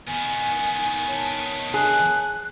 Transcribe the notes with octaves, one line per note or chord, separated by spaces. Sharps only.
D#3 B3 G#5
C#5 A5
G#4 F#6